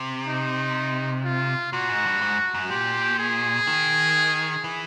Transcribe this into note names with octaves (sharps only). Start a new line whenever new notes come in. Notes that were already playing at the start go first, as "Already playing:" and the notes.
Already playing: C3
D#4
F4
A#2 F#4
G#2
G2
G#2
F#2
A#2 G4
G#4
D#3
E3